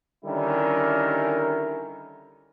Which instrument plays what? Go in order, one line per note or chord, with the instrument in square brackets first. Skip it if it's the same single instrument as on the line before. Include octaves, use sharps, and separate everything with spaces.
[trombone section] D3 D#3 G3 C#4 E4 A#4